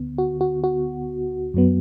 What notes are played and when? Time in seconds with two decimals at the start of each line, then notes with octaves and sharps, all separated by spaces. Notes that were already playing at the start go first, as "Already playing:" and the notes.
Already playing: D2 D3 B3
0.18 F#4
0.41 F#4
0.64 F#4
1.54 F#2 F#3 B3